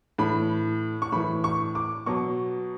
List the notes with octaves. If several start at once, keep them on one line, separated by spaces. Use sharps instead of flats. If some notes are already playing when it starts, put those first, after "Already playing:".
A2 E3 B5
C#6
A2 E3 B5
C#6
D6
B2 F#3 C#6